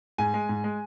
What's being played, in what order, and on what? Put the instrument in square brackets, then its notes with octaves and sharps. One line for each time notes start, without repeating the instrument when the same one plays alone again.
[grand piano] G#2 G#5
G#3
G#2
G#3